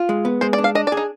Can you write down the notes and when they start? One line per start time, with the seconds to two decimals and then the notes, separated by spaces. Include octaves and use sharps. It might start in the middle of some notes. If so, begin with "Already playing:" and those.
Already playing: F4
0.09 G#3
0.25 B3
0.41 G#3 C5
0.53 D5
0.58 D4
0.64 F5
0.75 D4 D#5
0.87 D5
0.92 G#4
0.97 D#4